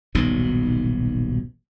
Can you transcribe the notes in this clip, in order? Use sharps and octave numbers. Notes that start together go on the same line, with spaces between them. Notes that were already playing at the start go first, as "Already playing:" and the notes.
D#1 B1 G#2 B2